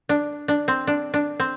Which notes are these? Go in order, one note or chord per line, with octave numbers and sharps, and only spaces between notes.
D4
D4
C4
D4
D4
C4